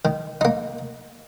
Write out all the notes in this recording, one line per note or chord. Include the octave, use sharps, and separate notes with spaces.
D#3
A#3 D#4